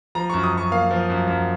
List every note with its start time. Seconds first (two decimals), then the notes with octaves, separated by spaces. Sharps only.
0.15 F3 A#5
0.30 F#2 C#6
0.44 D#6
0.53 F#2 C#6
0.71 A#3 F5
0.91 F3
1.10 F#2
1.28 F#2